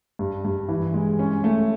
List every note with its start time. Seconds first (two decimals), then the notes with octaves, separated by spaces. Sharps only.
0.19 G2
0.45 G2
0.69 E3
0.94 G#3
1.19 C#4
1.44 A3